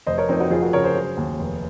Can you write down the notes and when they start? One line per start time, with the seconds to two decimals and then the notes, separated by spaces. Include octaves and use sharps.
0.07 F1 C5 D#5
0.18 A#4 C#5
0.29 F2 C4 D#4
0.40 D#4 F#4
0.51 F2 F4 G#4
0.62 F#4 A#4
0.73 C#3 A#4 C#5
0.84 G#4 C5
0.96 F#3
1.17 D#2
1.39 F1